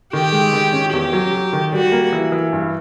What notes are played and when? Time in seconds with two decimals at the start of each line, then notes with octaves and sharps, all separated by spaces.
0.13 D#3 G4
0.32 G#3
0.53 D#3
0.73 C#4
0.93 E2 G4
1.13 F#3
1.33 F#3
1.53 D#3
1.72 G3 F#4
1.92 A#3
2.13 E3
2.32 E3
2.53 G2